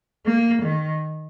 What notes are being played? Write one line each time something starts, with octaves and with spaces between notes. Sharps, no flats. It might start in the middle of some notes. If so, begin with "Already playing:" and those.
A#3
D#3